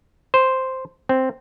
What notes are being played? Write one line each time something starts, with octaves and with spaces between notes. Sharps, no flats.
C5
C4